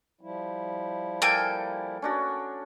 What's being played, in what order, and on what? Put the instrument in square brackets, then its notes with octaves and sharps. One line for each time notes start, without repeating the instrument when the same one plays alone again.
[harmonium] F3 G3 E4
[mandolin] A#3 G5 G#5 [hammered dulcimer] A4
[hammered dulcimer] C#4 D4 F#4